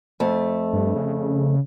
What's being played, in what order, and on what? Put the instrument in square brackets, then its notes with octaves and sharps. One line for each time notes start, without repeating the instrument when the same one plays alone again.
[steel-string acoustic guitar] F2 A3
[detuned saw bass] G2
C#3